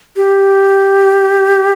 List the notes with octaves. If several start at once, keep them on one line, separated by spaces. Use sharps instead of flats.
G4